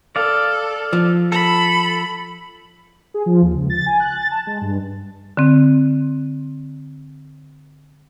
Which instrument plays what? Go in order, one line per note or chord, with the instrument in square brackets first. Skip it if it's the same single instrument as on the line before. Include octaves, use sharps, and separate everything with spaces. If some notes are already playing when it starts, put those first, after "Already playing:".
[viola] A4 [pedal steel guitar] D5 F5
[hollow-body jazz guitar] F3
[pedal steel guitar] A4 [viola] B5
[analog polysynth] G#4
F3
D#2
C#2
A6
G#5
F#6
A6
A5
G#3
G2
[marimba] D3 C4